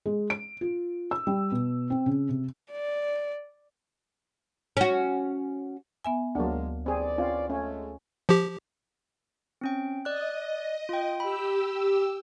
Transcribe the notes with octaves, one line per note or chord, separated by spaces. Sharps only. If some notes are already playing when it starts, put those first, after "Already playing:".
G#3
D7
F4
E6
G3
B2
C4
C#3
C3
D5
C#4 F#4
B3 E5 G#5
D2 F#3 G#3 A#3 D4
D#2 E3 C4 G#4 D5
C4 C#4 F4
G#3 A3 C#4
F3 G4
C4 C#4 G5
D5 D#5 F#6
F4 G5
G4 B5 E6